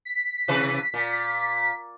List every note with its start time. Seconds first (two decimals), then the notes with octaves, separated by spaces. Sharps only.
0.05 B6
0.48 C3 E3 B4
0.94 A#2